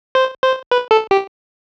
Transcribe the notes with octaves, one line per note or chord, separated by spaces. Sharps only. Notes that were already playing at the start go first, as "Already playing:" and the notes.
C5
C5
B4
A4
G4